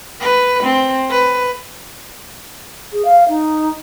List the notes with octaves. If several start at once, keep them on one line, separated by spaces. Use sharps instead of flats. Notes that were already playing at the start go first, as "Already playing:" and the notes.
B4
C4
B4
G#4
F5
D#4